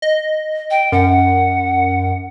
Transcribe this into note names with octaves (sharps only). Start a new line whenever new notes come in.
D#5
G5
F#2 F#5